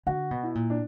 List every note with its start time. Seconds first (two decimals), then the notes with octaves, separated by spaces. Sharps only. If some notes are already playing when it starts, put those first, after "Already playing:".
0.07 D3 F#4
0.31 B2
0.43 E4
0.55 A#2
0.70 D4